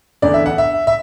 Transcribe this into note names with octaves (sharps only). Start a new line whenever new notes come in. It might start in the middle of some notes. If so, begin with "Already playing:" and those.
E2 D3 D5
E5
F#5
E5
E5